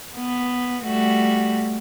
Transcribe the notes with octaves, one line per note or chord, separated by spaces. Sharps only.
B3
G3 A3 F#4